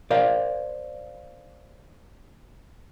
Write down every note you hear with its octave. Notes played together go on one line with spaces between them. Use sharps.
A#4 C5 D5 F5